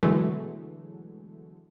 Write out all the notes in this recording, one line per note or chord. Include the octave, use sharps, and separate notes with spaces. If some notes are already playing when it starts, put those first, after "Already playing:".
B2 D3 E3 F#3 G#3 A3